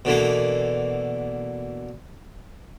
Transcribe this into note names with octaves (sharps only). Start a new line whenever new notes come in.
B2 D3 E3 A#3